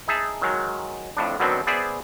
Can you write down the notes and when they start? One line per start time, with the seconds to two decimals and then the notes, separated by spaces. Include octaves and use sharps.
0.08 D#4 G#4 E5 A5
0.42 D#3 F#3 G#3
1.17 F2 A2 D4
1.40 B2 D3 D#3 F#3 B3 C4
1.67 B3 G#4 C5 D5 E5